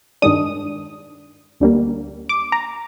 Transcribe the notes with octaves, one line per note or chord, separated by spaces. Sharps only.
G2 D#3 G#3 D4 D#6
D2 D3 G3 A#3
D6
A#5